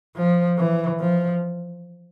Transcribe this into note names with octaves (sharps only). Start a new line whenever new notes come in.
F3
E3
F3